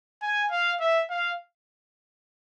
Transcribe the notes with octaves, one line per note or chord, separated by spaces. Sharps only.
G#5
F5
E5
F5